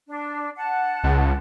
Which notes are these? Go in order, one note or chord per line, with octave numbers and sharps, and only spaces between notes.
D4
F#5 A5
C#2